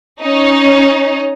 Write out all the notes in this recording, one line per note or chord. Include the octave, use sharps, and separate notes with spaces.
C#4 D#4